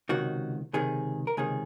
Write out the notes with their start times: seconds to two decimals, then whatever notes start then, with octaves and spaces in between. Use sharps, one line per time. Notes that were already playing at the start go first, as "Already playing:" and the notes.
0.09 C#2 C3 D#3 F#4
0.73 C#2 C3 D#3 G#4
1.27 A#4
1.37 C#2 C3 D#3 G#4